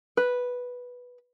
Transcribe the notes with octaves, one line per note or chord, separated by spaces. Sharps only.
B4